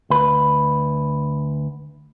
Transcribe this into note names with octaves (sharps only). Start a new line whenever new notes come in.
D2 B4